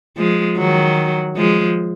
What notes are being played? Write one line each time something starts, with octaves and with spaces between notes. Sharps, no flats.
F3 G#3
D#3 F#3
F3 G#3